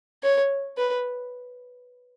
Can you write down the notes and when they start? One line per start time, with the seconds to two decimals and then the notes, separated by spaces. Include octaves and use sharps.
0.23 C#5
0.77 B4